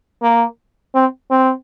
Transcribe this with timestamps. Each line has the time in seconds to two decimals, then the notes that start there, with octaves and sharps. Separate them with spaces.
0.22 A#3
0.94 C4
1.30 C4